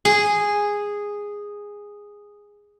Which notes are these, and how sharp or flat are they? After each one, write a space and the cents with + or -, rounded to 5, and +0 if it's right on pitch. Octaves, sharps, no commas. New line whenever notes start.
G#4 -10